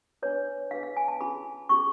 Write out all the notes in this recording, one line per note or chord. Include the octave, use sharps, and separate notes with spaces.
D4 G#4 B4 C#5
D4 G#4 B4 F5
F5
G#5
A5
C#4 F4 G#4 B5
C#4 F4 G#4 C#6